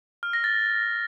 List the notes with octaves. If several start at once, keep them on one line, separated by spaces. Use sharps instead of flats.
F6
A#6
A6